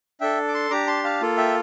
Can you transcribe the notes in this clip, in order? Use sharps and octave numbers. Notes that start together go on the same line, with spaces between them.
D4 A4 E5 G5
D6
A5 C6
D4 G4 A#5 D6
A5 C6
F5 A5
A#3 F4 A4
E5 G5